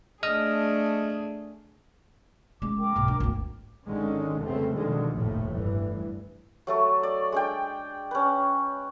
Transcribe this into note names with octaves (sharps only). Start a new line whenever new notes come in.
A3 D4 G#4 D#5 D#6 F6
G#3 C#4 D6
A#4 G5 D6
B1 G#2
D4
G#1 D2
G#1 D3 D#3 G#3 C#4
C2 F2 C#3 A3 B3 C4
B2 D3 D#3 F3 G#3
F1 A#1 D#2 A2 F3 A3
A1 G2 E3
F#3 A3 A4
D5
G#3 D4 G5
C#4 B4